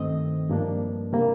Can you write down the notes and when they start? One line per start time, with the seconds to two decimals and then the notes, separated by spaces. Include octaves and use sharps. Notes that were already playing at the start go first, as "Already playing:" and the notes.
Already playing: G2 D#3 A3 C4 D#5
0.50 G2 F3 A#3 D4
1.13 C3 G3 A#3